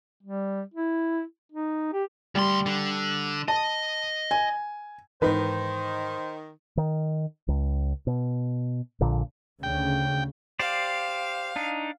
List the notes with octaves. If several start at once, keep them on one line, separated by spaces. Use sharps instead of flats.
G3
E4
D#4
G4
D2 G3 C6
D3
D#5 A5
G#5
G#2 D#3 E3 D#4 B4 C5
D#3
C#2
B2
A#1 A#2 D3
D2 C#3 G5
G4 C5 D5 F5
D4 D#4